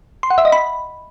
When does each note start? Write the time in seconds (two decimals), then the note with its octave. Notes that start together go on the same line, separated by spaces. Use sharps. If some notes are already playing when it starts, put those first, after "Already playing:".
0.23 C6
0.30 F#5
0.38 E5
0.45 D#5
0.52 B5